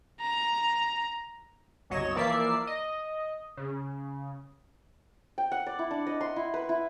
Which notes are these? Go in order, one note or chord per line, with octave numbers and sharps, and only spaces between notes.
A#5
G1 C2 F#3 C#5 D#5 E7
E3 F3 A#3 D5 E5 C7
D#5
C#3
G5
F#5
D5
E4
D4
D#5
C6
E4
B4
E4